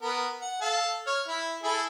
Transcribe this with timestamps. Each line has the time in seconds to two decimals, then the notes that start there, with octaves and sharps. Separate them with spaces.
0.02 B3 A#4
0.41 F#5
0.61 A4 F5 A5
1.07 C#5 F6
1.28 E4 E5
1.63 E4 G#4 A4